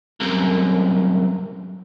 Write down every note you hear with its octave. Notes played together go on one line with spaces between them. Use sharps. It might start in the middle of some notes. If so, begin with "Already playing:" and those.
C2 F#2